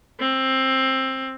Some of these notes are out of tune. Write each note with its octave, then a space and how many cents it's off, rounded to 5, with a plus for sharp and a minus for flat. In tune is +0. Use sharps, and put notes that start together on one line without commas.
C4 +15